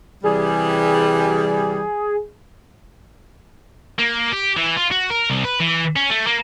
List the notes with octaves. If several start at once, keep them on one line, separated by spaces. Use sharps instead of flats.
C3 E3 G3 G#4
A#3
G4
E3
F4
F#4
A#4
C2
B4
E3
C#4
A3
A#3